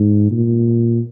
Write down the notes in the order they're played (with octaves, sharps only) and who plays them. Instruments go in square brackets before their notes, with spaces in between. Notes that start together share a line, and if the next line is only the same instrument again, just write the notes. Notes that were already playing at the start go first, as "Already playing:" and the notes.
Already playing: [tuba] G#2
A#2